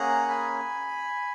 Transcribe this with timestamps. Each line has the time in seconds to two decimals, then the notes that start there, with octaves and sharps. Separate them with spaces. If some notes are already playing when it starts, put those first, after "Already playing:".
Already playing: A#3 C#4 G#4 F#5 A#5
0.28 G#5 B5